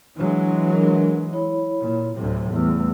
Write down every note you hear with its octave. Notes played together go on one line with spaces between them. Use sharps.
E3 F#3 G#3 D4
D4 A#4
E4 C#5 B5
A#2
D2 A2 C3 F#3
E2 G3 A3 E6